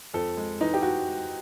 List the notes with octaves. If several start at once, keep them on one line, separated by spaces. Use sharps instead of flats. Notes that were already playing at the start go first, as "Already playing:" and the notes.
F2 A4
G#3
E3 D#4
G4
F#4